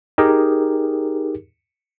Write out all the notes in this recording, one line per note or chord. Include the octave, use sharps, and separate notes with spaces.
D#4 G4 G#4 A#4